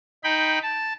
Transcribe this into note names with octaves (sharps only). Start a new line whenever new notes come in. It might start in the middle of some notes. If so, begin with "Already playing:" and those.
D#4 G5 B5
A5